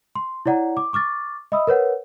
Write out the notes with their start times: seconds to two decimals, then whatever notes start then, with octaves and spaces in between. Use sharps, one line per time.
0.15 C6
0.46 E4 C#5 D5 F#5 A#5
0.77 D6
0.93 C#6 D6 F6 A6
1.52 D#5 E5 B5 D#6 E6
1.67 A#4 B4 C#5 F#5